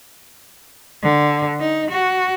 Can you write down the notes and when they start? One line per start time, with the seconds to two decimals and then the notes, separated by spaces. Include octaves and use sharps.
1.03 D3
1.60 D#4
1.91 F#4